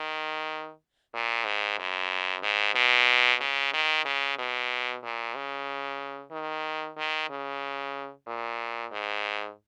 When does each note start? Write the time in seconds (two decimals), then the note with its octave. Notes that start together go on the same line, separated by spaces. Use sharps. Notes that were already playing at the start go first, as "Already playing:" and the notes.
Already playing: D#3
1.14 A#2
1.45 G#2
1.79 F#2
2.43 G#2
2.75 B2
3.40 C#3
3.73 D#3
4.05 C#3
4.38 B2
5.03 A#2
5.35 C#3
6.32 D#3
6.97 D#3
7.30 C#3
8.27 A#2
8.92 G#2